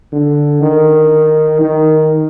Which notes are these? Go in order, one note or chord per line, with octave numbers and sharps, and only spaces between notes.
D3
D#3
D#3